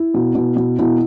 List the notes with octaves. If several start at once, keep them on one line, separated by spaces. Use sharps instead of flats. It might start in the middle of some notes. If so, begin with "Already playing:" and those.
Already playing: E4
B2
B2
B2
B2 E4